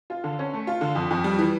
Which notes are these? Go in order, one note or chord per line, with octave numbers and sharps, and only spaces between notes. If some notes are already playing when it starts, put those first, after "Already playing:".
F4
D3
C#4
A3
F4
D3
F2
F2
G3
E3